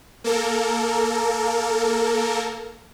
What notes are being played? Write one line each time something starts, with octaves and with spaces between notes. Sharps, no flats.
A#3 A4 A#4